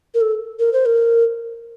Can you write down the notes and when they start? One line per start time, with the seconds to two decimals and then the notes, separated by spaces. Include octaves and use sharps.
0.14 A#4
0.21 A4
0.59 A#4
0.73 C5
0.86 A#4